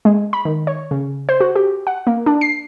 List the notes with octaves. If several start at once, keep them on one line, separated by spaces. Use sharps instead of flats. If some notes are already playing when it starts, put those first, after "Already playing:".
G#3
B5
D#3
C#5
C#3
C5
F#4
G4
F#5
A#3
D4
C7